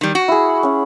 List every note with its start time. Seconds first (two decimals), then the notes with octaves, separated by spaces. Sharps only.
0.01 D#3 G3
0.15 F#4
0.28 E4 G#4
0.63 C#4 F#5